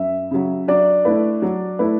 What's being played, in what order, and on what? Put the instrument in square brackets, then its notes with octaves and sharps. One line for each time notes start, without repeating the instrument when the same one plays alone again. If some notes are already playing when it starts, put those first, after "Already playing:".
Already playing: [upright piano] F#2 [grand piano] E5
[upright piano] C#3 F#3
[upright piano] F#3 [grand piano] D4 D5
[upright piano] A3 E4 B4
F#3
A3 E4 B4